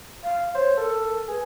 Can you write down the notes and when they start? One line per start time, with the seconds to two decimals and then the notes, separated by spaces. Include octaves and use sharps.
0.24 F5
0.55 C5 C#5
0.77 A4 A#4
1.28 G#4 B4